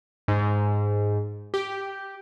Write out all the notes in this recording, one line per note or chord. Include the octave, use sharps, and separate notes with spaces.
G#2
G4